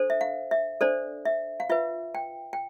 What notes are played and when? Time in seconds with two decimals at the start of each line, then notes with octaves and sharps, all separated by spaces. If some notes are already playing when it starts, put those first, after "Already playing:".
Already playing: D4 A4 C5
0.10 E5
0.21 F5
0.51 E5
0.81 D4 A4 C5 D5
1.25 E5
1.60 F5
1.70 F4 B4 E5
2.15 G5
2.53 G5